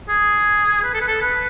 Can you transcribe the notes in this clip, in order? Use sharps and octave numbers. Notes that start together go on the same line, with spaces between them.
G#4
B4
A4
B4
A4
B4